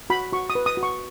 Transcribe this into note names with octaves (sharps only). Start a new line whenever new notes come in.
F#4 B5
F#4 C#6
D#6
B4
D#6
F#4
C#6